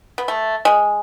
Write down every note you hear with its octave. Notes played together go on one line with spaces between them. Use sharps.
B3
A3
G#3